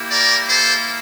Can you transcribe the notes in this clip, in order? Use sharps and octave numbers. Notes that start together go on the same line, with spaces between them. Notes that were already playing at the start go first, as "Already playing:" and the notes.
Already playing: A#3 E4 G4
A#4 D5
A4 C5